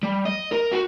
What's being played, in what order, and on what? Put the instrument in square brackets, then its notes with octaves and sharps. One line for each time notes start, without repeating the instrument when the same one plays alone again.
[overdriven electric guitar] G3
D#5
A#4
F#4